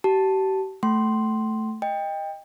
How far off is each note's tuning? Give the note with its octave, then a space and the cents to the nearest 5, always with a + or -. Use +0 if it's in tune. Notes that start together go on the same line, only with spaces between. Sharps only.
G4 -40 A5 +0
A3 +0 G5 -45 C6 +0
D#5 +0 G5 +20